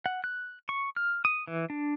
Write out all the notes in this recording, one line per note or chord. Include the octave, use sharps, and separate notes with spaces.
F#5
F#6
C#6
F6
D#6
E3
D4